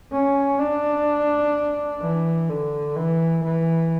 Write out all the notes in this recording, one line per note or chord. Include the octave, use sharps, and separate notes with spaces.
C#4
D4
E3
D3
E3
E3